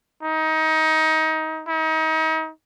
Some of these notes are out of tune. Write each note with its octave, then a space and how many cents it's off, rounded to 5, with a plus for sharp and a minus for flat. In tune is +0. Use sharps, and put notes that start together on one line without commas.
D#4 +25
D#4 +35